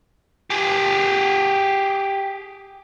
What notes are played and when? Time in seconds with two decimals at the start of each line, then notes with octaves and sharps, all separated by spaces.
0.50 G4 G#4